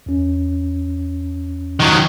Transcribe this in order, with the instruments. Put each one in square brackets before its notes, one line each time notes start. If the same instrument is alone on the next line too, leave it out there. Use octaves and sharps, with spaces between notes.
[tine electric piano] E2 C#4
[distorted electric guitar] D#3 F#3